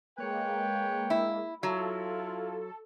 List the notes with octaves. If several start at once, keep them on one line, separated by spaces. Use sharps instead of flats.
G#3 A#3 B4 C#5 G5
E4
F#3 E4 F4 A4